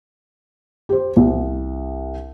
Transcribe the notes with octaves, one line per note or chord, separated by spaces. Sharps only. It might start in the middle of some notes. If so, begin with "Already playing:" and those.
G4 C5
C2